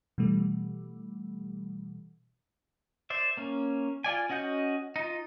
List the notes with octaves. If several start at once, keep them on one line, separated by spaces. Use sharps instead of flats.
B2 E3 G3 A3
C5 D5 E5
A#3 C#4
F4 D5 G#5
C#4 F#4 D#5 F#5 G6
D#4 F4